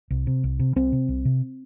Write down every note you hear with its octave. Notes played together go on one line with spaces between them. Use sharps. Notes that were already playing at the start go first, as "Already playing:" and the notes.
C2
C3
C2
C3
C2 C4
C3
C2
C3